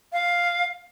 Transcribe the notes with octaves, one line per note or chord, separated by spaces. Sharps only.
F5